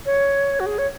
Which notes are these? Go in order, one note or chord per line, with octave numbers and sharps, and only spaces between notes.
C#5
F#4
G#4
C#5